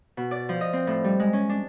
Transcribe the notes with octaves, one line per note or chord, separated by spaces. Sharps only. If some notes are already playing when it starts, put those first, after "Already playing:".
B2
D5
F3
D#5
C4
A2
G3
G#3
C#4
D4